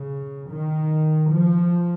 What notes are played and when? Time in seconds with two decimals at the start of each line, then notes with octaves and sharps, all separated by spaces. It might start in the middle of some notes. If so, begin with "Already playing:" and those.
Already playing: C#3
0.50 D#3
1.30 F3